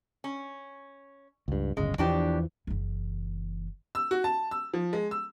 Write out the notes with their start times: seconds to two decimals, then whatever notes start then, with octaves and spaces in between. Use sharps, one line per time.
0.24 C#4
1.48 C#2 G2
1.77 D1 G1 C#3 G#3
1.98 E2 B2 E3 F3 D4 G4
2.67 F#1 E3
3.95 E6
4.11 F#4
4.24 A5
4.51 E6
4.74 F3
4.93 G#3
5.11 E6